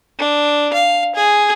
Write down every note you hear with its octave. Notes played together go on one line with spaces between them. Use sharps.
D4
F5
G#4